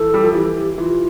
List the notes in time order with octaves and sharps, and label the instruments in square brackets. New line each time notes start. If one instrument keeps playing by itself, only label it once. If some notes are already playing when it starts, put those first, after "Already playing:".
Already playing: [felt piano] E3 [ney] A4
[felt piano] G3
F3
[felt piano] E3 [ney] G4
[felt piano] E3 [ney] F4